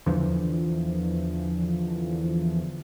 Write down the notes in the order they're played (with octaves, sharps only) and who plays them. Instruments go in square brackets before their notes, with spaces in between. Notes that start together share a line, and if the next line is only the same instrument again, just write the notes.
[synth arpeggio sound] E2 D3 E3 F3